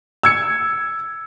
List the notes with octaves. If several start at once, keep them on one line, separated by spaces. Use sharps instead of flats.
E6 G#6 C#7